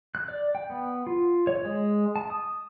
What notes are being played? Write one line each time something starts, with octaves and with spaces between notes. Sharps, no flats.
F#6
D5
G5
B3
F4
C#5
G#3
A5
D#6